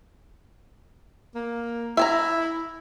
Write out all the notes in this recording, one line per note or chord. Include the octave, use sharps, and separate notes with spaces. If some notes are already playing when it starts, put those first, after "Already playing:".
A#3
E4 E5 G#5 A#5